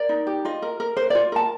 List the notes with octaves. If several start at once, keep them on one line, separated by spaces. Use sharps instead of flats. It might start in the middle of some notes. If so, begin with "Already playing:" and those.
Already playing: A#4 D5
D#4
G4
F4 D#5
A#4
A#4
A#4 C5
F4 D5
A#4 A5